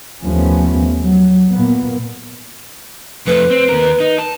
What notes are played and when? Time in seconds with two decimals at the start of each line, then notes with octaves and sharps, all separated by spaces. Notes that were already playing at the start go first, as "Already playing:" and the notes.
0.24 D#2 F3 A3 B3 C#4
1.02 F#3
1.51 A#2 A#3 B3
3.27 F2 A3 B4
3.50 C4
3.69 D#2 A#4
4.00 D#4
4.18 A5